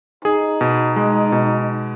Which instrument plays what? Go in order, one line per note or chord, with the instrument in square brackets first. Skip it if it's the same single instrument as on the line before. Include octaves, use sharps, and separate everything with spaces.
[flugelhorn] D#4 [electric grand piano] G#4
[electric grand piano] B2
G#3
B2